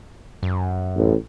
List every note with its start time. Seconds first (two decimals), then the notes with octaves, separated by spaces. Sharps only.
0.43 F#2
0.96 A1